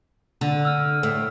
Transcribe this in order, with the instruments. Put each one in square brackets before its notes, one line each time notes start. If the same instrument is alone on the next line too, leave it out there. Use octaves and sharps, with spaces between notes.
[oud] D3
[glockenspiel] E6 F6
[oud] A2